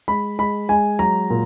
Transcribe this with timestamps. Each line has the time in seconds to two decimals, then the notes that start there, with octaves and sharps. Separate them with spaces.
0.08 G#3 B5
0.39 G#3 B5
0.69 G#3 G#5
0.99 F#3 A#5
1.30 A#2